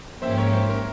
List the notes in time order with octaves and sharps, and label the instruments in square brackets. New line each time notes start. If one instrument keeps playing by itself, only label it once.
[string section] G#2 F3 A#3 C#4 G4 [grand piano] C5 E5
[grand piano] A#4 C#5
C5
A#4